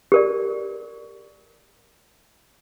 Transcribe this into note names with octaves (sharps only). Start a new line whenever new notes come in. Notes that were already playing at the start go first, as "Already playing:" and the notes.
G4 A#4 D5